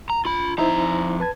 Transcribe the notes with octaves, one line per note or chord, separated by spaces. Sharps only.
A#5
F4 B5
F2 D#4 E4 C5 A#5
B4 A5 G#6